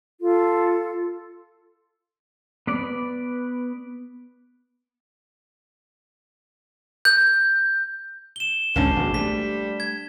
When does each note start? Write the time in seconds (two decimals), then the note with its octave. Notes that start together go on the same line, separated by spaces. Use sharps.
0.20 F4 A4
2.67 B3 B4 D5
7.05 G6
8.36 E7 G7
8.76 G#1 C#2 A2 C#4 D4 C5
8.96 G#1 B2
9.14 G3 A3 B6
9.80 G#6